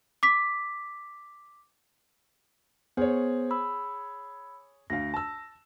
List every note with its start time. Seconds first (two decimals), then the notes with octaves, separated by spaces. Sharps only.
0.23 D6 B6
2.97 B3 G#4 C5 C#5
3.51 B5 E6
4.90 D2 F5 A#6
5.14 A5 E6